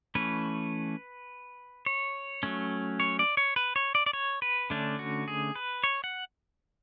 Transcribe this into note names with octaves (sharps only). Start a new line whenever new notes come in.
E3 A3 C#4 B4
C#5
F#3 A3 C#4
C#5
D5
C#5
B4
C#5
D5
D5
C#5
B4
D3 A3 C#4 D4
F#4
G#4
B4
C#5
F#5